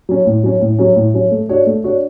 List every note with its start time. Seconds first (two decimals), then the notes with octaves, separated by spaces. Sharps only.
0.09 F#3 C#4
0.26 A2
0.44 F#3 C#4
0.61 A2
0.79 F#3 C#4
0.96 A2
1.14 F#3 C#4
1.31 A3
1.49 D4 F#4 C#5
1.67 A3
1.84 D4 F#4 C#5